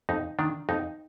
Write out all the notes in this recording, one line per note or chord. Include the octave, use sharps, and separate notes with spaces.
F2 D#4
D#3 D4
F2 D#4